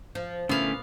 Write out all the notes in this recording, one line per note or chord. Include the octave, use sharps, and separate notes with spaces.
F3
A#2 D3 A3 B3 C#4 E4 F5